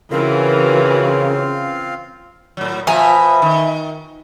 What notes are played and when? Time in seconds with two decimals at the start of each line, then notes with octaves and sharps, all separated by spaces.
0.11 C#3 E3 C4 F4 F#4 A#4 F5
2.57 A2 F#3
2.87 B2 F3 E5 G#5 A#5
3.42 D#3